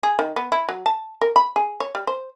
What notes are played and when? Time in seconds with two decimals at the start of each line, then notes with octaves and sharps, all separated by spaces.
0.03 G#4
0.19 D#3
0.36 B3
0.52 E4
0.69 F#3
0.86 A5
1.21 A#4
1.36 B5
1.56 G#4
1.80 C#5
1.95 G3
2.07 C5